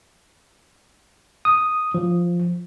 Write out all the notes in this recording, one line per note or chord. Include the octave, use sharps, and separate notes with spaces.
D#6
F3